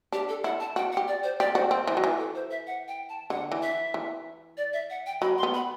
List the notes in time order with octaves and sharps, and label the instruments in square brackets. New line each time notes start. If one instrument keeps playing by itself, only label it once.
[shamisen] D4 [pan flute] G4
[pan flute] A4
[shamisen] E4 [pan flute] F#5
[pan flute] A5
[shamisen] F#4 [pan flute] G5
[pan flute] F#5
[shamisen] G4
[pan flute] D5
C5
[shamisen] G4 [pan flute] D5
[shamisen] F#4 [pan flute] C5
[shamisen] C4 [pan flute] C5
[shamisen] E3 [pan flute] C5
[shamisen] F#3
[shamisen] E3 [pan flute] B4
[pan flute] A4
C5
E5
F#5
G5
A5
[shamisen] D3 [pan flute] F#5
[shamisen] E3
[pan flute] E5
[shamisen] E3
[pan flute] D5
E5
F#5
G5
[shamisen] F#3 [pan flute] B5
[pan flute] C6
[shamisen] B3
[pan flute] B5